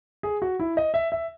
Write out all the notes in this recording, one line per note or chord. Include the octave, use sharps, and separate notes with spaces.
G#4
F#4
E4
D#5
E5
E5